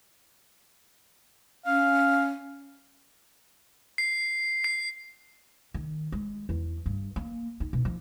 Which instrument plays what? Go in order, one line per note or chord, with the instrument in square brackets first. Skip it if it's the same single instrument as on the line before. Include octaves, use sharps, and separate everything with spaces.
[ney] C#4 [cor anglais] F5
[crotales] C7
C7
[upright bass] D#3
G#3
E2
G2
A#3
D#4
B2
F3